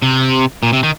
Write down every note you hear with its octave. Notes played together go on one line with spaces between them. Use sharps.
C3
A#2
C3
D#3